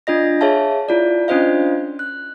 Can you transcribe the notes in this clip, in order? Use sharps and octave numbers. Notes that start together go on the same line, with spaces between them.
D4 F4 D#5 A#6
G#4 C#5 E5 F5 A5
E4 F4 D5
C#4 D4 F4 C5 D#5 F5
F#6